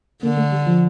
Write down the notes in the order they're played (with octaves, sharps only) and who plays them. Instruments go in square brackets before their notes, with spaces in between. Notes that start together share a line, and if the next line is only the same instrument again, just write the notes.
[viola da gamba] D3 [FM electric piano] A#3
[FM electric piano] A3
G3
F3